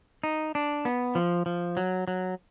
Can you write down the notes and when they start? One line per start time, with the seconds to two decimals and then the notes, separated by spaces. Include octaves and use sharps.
0.24 D#4
0.55 D4
0.85 B3
1.15 F3
1.46 F3
1.77 F#3
2.08 F#3